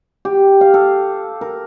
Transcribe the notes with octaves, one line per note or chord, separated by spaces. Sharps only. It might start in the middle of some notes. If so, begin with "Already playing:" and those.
G4
F5
A4
A#4